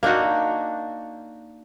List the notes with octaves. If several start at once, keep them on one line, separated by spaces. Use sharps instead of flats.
A#3 D4 D#4 F#4